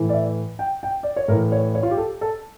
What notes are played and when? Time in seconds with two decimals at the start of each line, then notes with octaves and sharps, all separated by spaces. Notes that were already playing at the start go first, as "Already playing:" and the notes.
Already playing: A2 E3
0.09 D5
0.13 E5
0.59 G5
0.83 G5
1.03 D5
1.16 C#5
1.28 A2 A#4
1.33 E3
1.52 C#5
1.75 C#5
1.83 F4
1.91 G4
1.97 A4
2.21 A4